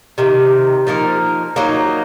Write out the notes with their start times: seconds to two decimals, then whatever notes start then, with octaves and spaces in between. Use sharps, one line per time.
0.18 C3 D#3 A#3
0.87 F3 A#3 D#4 A#4
1.56 F#3 A#3 D#4